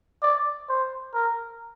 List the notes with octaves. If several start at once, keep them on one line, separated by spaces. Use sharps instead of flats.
D5
C5
A#4